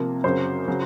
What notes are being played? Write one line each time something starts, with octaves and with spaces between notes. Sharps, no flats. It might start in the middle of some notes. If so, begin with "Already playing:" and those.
Already playing: C3 F3 A#3
F#2 C#3 F#3 C5
C#3 F#3